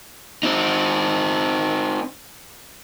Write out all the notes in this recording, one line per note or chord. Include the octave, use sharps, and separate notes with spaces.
C4 D#4